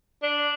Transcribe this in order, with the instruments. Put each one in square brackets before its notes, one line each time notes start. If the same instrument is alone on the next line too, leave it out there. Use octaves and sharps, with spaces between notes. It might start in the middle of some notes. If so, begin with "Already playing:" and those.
[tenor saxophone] D4